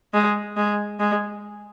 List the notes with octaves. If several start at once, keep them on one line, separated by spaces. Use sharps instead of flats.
G#3
G#3
G#3